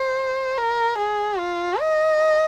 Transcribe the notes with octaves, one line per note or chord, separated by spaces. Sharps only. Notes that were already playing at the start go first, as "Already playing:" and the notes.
Already playing: C5
A#4
G#4
F4
D#5